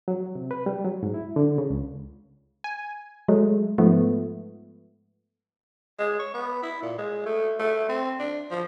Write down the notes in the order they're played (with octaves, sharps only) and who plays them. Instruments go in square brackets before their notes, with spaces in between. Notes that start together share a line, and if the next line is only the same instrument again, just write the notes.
[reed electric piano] F#3
C3
B4
G3
F#3
G#2
E4
D3
C#3
C#2
[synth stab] G#5
F#3 G#3 A3
G#2 F3 A3 B3
[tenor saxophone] G#3
C#5
B3
E4
A#2
G#3
A3
A3
C4
D4
F3